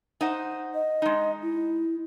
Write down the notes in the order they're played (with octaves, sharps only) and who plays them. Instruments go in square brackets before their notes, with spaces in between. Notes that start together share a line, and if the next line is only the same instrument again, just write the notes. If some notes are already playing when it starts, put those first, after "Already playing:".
[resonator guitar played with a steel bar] D#4 C5 F#5
[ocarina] D#5
[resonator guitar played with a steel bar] G#3 D#4
[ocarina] E4